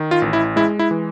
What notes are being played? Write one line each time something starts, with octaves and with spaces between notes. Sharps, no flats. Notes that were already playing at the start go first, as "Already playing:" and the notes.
Already playing: D#3
F4
A1
E4
G#3 E4
E4
E3